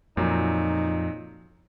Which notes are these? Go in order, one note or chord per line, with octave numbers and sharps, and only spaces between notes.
F2 A#2 F#3 D#4